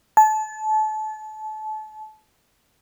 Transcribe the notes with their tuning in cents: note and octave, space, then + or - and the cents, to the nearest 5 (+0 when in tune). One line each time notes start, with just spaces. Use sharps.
A5 -30